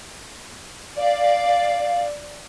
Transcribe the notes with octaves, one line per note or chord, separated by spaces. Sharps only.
D5 F5